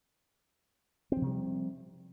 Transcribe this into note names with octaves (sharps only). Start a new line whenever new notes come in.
C3 F3 G3 C4